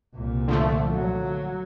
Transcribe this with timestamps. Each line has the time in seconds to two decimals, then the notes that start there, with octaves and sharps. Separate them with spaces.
0.15 C2 A#2
0.48 D3 F3 A3
0.93 F#3